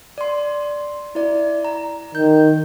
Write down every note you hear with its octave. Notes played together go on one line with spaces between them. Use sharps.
D5 C6
E4 D5
A#5
D#3 G6